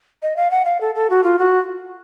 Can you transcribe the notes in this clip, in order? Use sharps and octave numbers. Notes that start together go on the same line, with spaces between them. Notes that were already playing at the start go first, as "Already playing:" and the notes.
D#5
F5
F#5
F5
A4
A4
F#4
F4
F#4